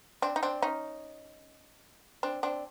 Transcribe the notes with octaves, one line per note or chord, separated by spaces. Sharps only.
C4 D4
D#4
C4 D4
C#4 D#4
C4 D4
C4 D4